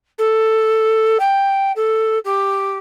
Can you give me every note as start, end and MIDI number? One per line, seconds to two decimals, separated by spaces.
0.18 1.17 69
1.19 1.72 79
1.76 2.18 69
2.24 2.78 67